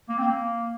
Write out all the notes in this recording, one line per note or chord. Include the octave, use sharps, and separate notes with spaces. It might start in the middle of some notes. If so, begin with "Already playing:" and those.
A#3
C4
A#3